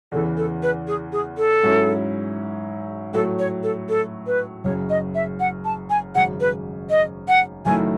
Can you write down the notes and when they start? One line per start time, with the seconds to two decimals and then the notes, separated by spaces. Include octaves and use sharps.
0.12 E2 C#3 E3 A4
0.37 A4
0.63 B4
0.87 G#4
1.12 G#4
1.38 A4
1.63 G#2 F#3 C#4 E4
3.13 A2 F#3 A3 A4
3.39 C#5
3.63 A4
3.89 A4
4.27 B4
4.64 F#1 F#2 C#3 C#5
4.90 D#5
5.15 E5
5.40 F#5
5.65 A5
5.90 G#5
6.15 G#1 F#2 C#3 F#5
6.40 B4
6.90 D#5
7.28 F#5
7.65 F#1 F#2 D#3 A3 E4 G#5